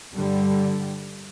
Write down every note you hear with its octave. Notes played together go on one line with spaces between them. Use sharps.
G2 D3 G3